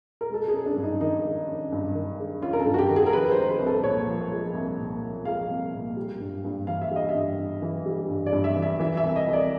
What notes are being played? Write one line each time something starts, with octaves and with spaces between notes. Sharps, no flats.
A#4
G#3 A4
C#4 G#4
D4
G2
D#4
D#3 D#4
G#3
C#4
G2
D#3
G#3
C#4 F4
A#4
A4
G2
F#4
G4
D#3
G#4
A#4
F3 B4
C5
G#3
B4
C2
A4
A#2 C#5
F3
G#3
C2
A#2
F3
G#3 F5
C2
A#2
G3
G2
G2
E3 F5
E5
G3 D#5
E5
G2
G2
E3
G3
G2
D5
G2
E5
E3
E5
E3 E5
E5
C2
D#5
C2
D5